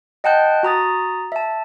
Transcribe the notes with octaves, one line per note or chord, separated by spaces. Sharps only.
D#5 F#5 G5 A5 F#6 G6
F#4 A#5 D#6 A6
E5 A5